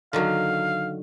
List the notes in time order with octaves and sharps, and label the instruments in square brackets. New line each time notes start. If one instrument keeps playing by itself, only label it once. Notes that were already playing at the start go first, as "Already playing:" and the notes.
[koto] D3 D#3 F#3 [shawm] F5